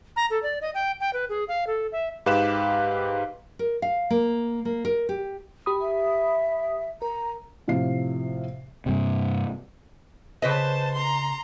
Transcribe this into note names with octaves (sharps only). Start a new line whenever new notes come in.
A#5
A4
D5
D#5
G5
G5
B4
G#4
F5
A4
E5
G#2 G4 B4 F5 F#6 E7
A#4
F5
A#3
A#3
A#4
G4
G4 B5 D#6
E5
A#4 A#5
A2 C3 F3 F5 C7
G2 C3
C#3 B4 C5 D#5 A5
A#5 C6